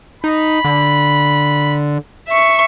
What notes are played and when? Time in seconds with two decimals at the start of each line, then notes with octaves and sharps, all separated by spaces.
0.24 D#4 B5
0.65 D3
2.28 E5 C#6